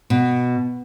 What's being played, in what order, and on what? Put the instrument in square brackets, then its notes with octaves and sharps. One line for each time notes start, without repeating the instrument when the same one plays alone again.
[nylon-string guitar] B2